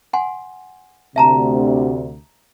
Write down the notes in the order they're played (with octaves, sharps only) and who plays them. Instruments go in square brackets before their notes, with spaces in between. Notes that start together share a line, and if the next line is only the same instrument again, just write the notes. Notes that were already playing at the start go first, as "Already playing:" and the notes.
[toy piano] F#5 G#5 C6
[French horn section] D2 C3 [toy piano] E5 A5 A#5